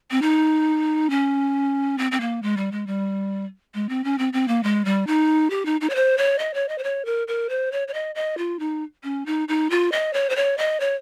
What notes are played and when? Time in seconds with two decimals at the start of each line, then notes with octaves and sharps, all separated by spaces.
0.11 C4
0.22 D#4
1.10 C#4
1.98 C4
2.12 C4
2.20 A#3
2.42 G#3
2.57 G3
2.72 G#3
2.87 G3
3.74 G#3
3.89 C4
4.04 C#4
4.18 C4
4.33 C4
4.48 A#3
4.63 G#3
4.85 G3
5.07 D#4
5.50 G4
5.65 D#4
5.81 D#4
5.90 C#5
5.95 C5
6.18 C#5
6.39 D#5
6.54 C#5
6.68 D#5
6.78 C5
6.84 C#5
7.05 A#4
7.27 A#4
7.49 C5
7.72 C#5
7.88 C#5
7.94 D#5
8.15 D#5
8.38 F4
8.59 D#4
9.04 C#4
9.26 D#4
9.48 D#4
9.70 F4
9.92 D#5
10.13 C#5
10.29 C5
10.36 C#5
10.58 D#5
10.80 C#5